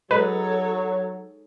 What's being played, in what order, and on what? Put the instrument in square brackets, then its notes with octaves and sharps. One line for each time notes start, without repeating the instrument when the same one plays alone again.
[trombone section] F#3 [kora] G#3 D#4 [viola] A4 C#5 [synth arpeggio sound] B4